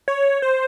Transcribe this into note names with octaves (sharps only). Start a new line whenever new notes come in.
C#5
C5